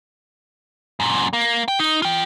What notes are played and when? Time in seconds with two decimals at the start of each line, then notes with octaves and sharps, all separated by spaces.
1.00 F#2 A#2
1.33 A#3
1.68 G5
1.79 D#4
2.02 F4 G5